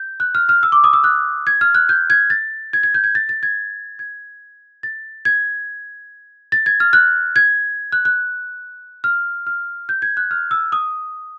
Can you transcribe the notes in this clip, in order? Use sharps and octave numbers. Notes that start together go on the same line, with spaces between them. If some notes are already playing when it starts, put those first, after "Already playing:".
Already playing: G6
F#6
F6
F6
E6
D6
D#6
E6
F#6
G#6
F6
F#6
G6
G#6
A6
G#6
G#6
G6
G#6
A6
A6
G#6
G#6
A6
G#6
A6
G#6
F6
F#6
G#6
F#6
F#6
F6
F6
G6
G#6
F#6
F6
E6
D#6